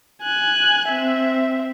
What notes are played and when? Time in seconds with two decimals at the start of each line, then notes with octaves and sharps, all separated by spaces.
0.22 G#5 F#6
0.89 C4 E5